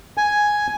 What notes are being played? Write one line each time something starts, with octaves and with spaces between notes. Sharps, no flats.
G#5